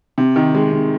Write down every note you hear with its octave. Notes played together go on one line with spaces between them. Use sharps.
C3
D#3
G#3
C3